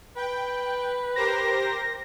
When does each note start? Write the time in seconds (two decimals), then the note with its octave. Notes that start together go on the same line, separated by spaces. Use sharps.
0.16 B4 G5
1.16 G4 A#4 C5 A#6